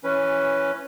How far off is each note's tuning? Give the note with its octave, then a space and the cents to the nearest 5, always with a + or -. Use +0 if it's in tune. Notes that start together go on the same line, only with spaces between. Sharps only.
E3 +0 C#4 +0 B4 +0